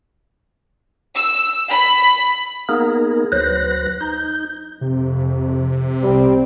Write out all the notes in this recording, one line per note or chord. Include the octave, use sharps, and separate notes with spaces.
E6
B5
A#3 B3 D#4 G#4 A#4
D2 F#3 B4 C5 F#6 A#6
D#4 G6
F2 C3
C2 G3 C4